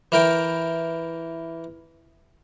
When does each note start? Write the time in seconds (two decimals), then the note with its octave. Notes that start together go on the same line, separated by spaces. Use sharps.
0.12 E3 A#4 G5